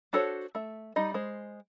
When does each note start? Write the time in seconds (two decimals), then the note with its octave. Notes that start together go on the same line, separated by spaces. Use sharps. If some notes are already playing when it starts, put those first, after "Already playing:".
0.13 D4 F#4 A4 C5 C#5
0.55 A3 E5
0.96 G3 D#4 D#5
1.14 G#3 C5